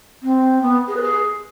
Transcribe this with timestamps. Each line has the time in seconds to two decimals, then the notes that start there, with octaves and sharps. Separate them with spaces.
0.22 C4
0.61 B3
0.87 G#4
0.96 B4
1.00 G#4